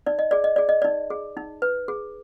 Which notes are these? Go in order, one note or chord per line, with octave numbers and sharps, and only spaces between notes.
D#4 D5
D#5
G#4 D5
D#5
G#4 D5
D#5
D#4 D5
G#4
D#4
B4
G#4